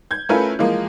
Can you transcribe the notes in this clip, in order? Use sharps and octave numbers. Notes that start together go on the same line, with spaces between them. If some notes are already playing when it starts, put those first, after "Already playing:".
G6 G#6
A3 C#4 E4 F4 A#4 B4
E3 F3 G#3 A#3